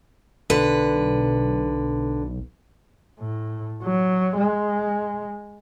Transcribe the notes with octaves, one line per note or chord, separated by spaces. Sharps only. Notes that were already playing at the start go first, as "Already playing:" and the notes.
B1 D3 B4
A2
F#3
G#3